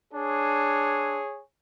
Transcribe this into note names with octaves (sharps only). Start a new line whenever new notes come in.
D4 G#4 C#5